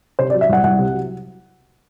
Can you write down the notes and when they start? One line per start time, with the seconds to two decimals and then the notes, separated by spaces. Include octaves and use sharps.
0.19 C3 C5
0.30 D5
0.34 F#3
0.41 E5
0.49 C2 F#5
0.64 C2 F#5
0.79 C3
0.93 F#3